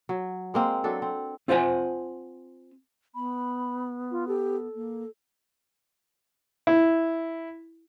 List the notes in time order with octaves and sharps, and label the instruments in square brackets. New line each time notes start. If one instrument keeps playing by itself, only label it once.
[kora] F#3
G#3 A#3 C4
F#3 D4 A4
C4
[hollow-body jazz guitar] C4 F4 C5 E5 F#5 G#5
[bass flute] B3 [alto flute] B5
[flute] F4
[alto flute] G4 [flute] A4
[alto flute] A#3
[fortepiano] E4